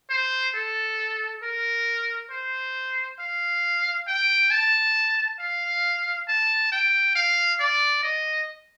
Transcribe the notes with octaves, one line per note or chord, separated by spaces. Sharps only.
C5
A4
A#4
C5
F5
G5
A5
F5
A5
G5
F5
D5
D#5